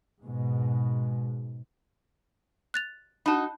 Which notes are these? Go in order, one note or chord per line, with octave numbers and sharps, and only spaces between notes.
G#2 B2 G#3
F#6 A6 F7
D#4 F#4 A5 B5